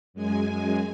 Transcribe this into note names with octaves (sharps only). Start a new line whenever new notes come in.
F#2 G#3 G#5